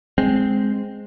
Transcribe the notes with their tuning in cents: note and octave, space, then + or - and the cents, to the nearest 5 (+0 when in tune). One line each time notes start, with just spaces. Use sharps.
G#3 +0 C4 -5